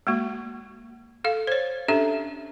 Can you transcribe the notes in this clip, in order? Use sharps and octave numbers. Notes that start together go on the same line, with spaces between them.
G#3 A#3 F#4
A4 F5
C5 C#5
C#4 D4 G4 A4 E5